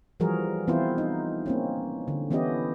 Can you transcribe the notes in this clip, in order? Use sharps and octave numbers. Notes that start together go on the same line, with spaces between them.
E3 F3 G3 F#4 G#4 A#4
E3 B3 C4 E4 F4 C5
D#4
A#3 C4 C#4
D3
E3 B3 C#4 E4 G4 D#5